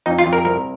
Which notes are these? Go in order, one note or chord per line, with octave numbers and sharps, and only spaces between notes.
F2 D#4
F4
F2
A#4
C2 A#4